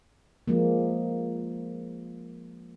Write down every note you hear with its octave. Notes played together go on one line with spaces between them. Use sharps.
F3 G#3 A#3